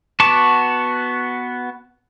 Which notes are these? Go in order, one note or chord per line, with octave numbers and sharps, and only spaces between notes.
B3 F#4 A5 C#6 D6